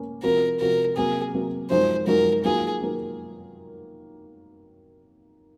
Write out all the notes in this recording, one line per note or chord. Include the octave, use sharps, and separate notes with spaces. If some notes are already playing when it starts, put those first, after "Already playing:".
Already playing: A#3 C#4
C3 F3 C4 F#4 A#4
C3 F3 C4 F#4 A#4
C3 F#3 A#3 G#4
C3 F#3 A#3
F#2 F3 G#3 D#4 F#4 C5
F#2 F3 G#3 D#4 F#4 A#4
D#3 F#3 A#3 F4 G#4
D#3 F#3 A#3